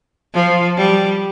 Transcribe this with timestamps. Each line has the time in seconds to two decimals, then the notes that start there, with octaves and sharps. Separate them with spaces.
0.34 F3
0.77 G3